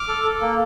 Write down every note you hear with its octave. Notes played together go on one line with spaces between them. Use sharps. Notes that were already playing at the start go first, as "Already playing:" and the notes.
Already playing: D6 F6
A4
A4
A#3